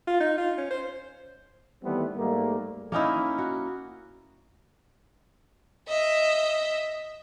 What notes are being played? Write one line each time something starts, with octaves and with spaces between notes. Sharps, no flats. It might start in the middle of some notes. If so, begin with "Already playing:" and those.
F4
D#4
F4
C#4
C5
D#3 E3 G3 A3 B3 C4
G#2 G3 A3 A#3
A#3 C#4 D#4 E4
F#4
D#5 E5